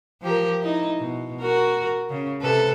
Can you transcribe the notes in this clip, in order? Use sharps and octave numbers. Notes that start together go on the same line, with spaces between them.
F3 G4 A#4
D#4 E4
B2
F#4 A#4
C#3
C3 A4 B4